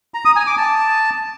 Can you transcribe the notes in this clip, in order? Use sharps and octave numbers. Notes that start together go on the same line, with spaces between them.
A#5
D#6
G#5
D6
A5